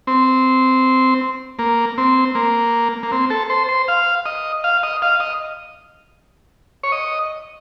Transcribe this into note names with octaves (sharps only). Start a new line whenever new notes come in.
C4
A#3
C4
A#3
A#3
C4
A4
C5
C5
F5
D#5
F5
D#5
F5
D#5
C#5
D#5